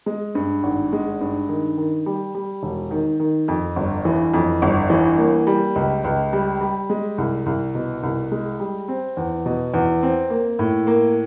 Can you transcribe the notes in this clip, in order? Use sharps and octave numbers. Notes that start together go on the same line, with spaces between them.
G#3
G2
G#1
G#3
G2
D#3
D#3
G3
G3
E1
D#3
D#3
F2
G1
E3
F2
G1
E3
A#3
G3
C#2
C#2
G3
G3
G#3
C2
C2
B2
C2
G#3
G3
C4
E2
B2
E2
C4
A#3
A2
A#3